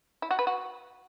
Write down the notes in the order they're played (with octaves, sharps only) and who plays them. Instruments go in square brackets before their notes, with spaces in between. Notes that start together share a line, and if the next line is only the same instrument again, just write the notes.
[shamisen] E4
F#4
B4
F#4